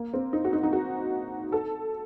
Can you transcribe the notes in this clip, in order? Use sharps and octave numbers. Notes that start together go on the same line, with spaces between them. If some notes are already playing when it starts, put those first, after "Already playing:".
Already playing: A#3
C4
D#4
F#4
D#4
D#4
F#4
A4